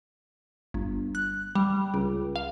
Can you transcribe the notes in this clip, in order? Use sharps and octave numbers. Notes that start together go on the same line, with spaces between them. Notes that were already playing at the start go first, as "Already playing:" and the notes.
G1
F#6
G3
C#2
F5